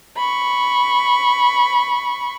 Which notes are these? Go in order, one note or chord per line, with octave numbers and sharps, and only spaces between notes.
B5 C#6